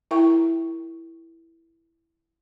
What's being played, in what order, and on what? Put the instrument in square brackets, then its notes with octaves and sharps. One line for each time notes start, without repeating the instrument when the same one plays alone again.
[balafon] E4 A#4 E5 G5 A#5 C#6